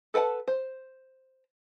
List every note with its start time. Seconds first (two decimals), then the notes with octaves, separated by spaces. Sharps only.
0.14 A4 B4 F#5 G5 A5
0.48 C5